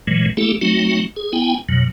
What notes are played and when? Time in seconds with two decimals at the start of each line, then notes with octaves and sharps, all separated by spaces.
0.07 A#2 E3 F#3 G#3
0.37 A3 A#3 E4 G4 A4
0.61 F#3 A3 C4 D#4 F#4
1.16 G#4
1.33 B3 E4 G5 G#5
1.69 F2 B2 F#3